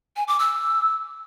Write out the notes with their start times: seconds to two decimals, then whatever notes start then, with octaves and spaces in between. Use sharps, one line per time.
0.16 G#5
0.28 D6
0.39 E6